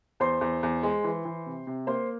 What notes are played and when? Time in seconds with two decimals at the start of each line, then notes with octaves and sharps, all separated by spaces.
0.20 E2 C5 C6
0.41 E2
0.63 E2
0.83 G#3
1.04 E3
1.25 E3
1.46 C3
1.67 C3
1.87 A#3 C5 C6